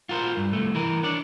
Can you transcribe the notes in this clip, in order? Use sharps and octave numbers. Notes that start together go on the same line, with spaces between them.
F4 F#4 A#4 C5
G2
C2 A3
E3 A#4
D4 C#5 D5